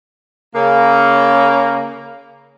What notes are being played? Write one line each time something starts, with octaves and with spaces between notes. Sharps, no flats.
C#3 A#3